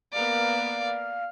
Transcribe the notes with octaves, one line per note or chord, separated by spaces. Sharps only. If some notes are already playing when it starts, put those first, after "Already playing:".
A#3 B3 A#4 D5 F5